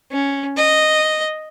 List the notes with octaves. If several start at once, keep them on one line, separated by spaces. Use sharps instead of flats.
C#4
D#5